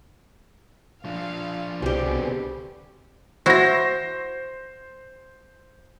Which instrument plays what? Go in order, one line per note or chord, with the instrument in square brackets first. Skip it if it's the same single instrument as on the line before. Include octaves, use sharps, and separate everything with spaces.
[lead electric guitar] F3 D4 [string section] F5
[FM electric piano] C2 [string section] B2 B3 C4 [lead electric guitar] D3 G#4 [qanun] G3 G4
[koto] E4 F#4 [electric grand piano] C5 A#6